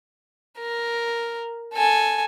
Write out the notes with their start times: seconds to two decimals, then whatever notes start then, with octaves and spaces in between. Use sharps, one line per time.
0.59 A#4
1.74 A4 G#5